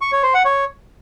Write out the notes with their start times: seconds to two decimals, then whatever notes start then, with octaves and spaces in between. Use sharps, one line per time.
0.01 C#6
0.12 C#5
0.23 C5
0.34 F#5
0.45 C#5